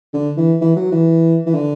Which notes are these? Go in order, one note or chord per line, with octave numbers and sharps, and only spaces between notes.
D3
E3
E3
F#3
E3
E3
D3